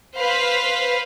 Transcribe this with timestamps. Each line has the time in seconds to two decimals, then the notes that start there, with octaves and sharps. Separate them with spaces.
0.18 B4 C5 F5